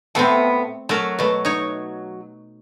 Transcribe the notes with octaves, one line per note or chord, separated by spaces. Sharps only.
A2 A3 B3 C4
F#3 A3 A#4
B2 A3
D#4 C#5